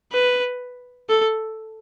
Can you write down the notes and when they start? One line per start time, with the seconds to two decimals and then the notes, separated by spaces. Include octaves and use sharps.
0.13 B4
1.09 A4